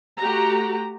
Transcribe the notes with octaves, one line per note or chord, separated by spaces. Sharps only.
A3 F#4 G4 A#5